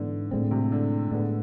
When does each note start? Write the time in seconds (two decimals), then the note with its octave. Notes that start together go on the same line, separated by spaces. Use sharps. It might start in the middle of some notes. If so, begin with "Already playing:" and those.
Already playing: G#2 D3 E3 B3
0.31 A2 D3 G#3 C4
0.51 C3
0.72 D3
1.11 A2 D3 G#3 B3